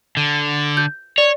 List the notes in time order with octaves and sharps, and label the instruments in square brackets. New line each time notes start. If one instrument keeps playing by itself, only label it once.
[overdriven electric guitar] D3
[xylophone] G6
[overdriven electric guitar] C#5 [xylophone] D5